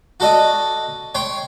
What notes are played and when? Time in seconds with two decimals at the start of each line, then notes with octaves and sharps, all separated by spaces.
0.20 F#4 A4 D5 D#5
1.15 C#5 G5 C6